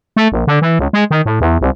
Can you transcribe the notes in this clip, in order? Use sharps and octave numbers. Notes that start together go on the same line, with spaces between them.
A3
A#1
D3
E3
C#2
G#3
D#3
A2
E2
C2